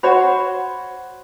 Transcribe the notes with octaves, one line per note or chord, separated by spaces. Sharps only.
F#4 C5 C#5 F#5 B5